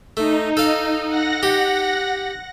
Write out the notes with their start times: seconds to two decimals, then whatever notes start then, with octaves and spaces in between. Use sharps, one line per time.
0.17 A3 D#4
0.57 A4 F5
1.07 F#5 A#6
1.43 G4